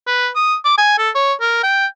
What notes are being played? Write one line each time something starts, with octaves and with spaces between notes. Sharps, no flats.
B4
D#6
D6
G#5
A4
C#5
A#4
G5